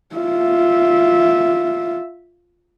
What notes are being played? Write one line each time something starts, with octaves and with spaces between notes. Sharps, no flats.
F4 E5